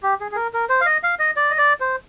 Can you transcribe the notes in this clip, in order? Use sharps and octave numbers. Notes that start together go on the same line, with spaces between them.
G4
G#4
G#4
A#4
A#4
C5
F5
D#5
F5
D#5
D5
D#5
D5
C5